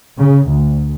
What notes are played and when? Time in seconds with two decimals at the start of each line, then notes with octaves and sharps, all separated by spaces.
0.18 C#3
0.49 D2